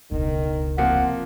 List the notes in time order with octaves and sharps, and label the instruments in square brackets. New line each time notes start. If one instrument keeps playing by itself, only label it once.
[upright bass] E1 C#2 [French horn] D#3
[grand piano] C3 F3 A#3 [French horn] F4 [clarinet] F#5